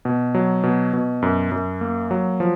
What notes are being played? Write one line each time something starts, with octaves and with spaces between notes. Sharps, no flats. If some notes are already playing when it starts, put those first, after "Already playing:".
B2
F#3
B2
B2
F#2
F#2
A#3
F#3
F3